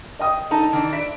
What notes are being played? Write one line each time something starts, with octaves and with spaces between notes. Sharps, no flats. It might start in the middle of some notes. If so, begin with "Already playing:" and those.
D#5 G5 D#6
D#4 A4 A5 A#5
D#3 E3 D4
E5 B6 D7